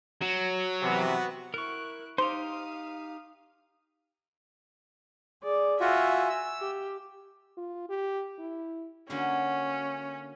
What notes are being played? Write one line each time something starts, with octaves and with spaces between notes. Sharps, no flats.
F#3
C3 E3 B3 F#4
E4 A#4 C#6 F#6
D#4 G4 C5 F5 C6 D#6 F7
G#4 D5
F4 F#4 E5 G#5
E6
G4
F4
G4
E4
D3 A#3 C#4 F#4